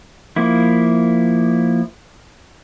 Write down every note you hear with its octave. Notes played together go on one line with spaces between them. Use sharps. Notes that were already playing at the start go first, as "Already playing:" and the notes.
F3 A#3 E4